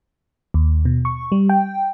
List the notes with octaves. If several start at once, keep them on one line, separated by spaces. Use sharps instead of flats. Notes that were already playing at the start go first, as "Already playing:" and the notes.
D#2
B2
C#6
G3
G5